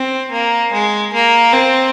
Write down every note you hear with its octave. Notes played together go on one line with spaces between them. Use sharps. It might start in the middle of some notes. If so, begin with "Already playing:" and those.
Already playing: C4
A#3
G#3
A#3
C4